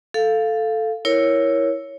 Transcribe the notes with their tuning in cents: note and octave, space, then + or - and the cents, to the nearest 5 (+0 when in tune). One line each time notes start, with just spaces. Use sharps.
A4 +0 F5 +0
E4 +0 A#4 +5 C#5 +0